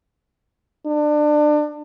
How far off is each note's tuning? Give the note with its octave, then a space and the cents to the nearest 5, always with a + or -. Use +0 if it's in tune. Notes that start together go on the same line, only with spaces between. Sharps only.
D4 +25